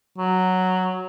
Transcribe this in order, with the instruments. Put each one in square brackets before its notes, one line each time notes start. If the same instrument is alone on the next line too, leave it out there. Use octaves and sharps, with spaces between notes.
[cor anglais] F#3